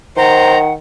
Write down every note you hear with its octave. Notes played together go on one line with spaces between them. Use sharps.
D#3 C5 F#5 A#5